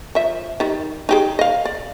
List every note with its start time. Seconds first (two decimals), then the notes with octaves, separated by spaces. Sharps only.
0.15 F3 E5
0.60 D#3 G3
1.09 D#4 G4 G#4
1.39 D#5 F5
1.65 D5